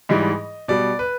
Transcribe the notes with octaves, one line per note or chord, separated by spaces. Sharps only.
G#2 E3 G3 D#5
B2 G3 D5
B4